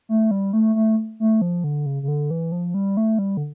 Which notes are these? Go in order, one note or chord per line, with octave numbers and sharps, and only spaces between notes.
A3
G3
A3
A3
A3
F3
D3
C#3
C#3
D3
E3
F3
G3
A3
G3
D3